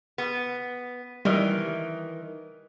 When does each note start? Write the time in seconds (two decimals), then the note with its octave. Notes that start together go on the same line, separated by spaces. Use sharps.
0.18 B3
1.25 D#3 E3 G3